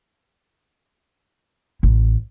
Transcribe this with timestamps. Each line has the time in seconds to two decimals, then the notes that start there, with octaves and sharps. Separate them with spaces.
1.83 A1